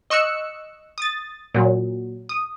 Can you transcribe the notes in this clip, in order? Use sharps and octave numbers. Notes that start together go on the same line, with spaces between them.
D#5 C#6 E6 F#6 C#7
D#6 A6
A#2 F#3
D#6